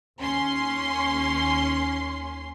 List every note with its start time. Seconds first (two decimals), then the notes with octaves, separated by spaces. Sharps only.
0.20 D#2 C#4 C6